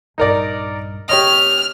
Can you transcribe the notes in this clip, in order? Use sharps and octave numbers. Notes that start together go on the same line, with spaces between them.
A#1 G2 D#4 A#4 D5
C#3 B3 G4 C#5 D#5 F6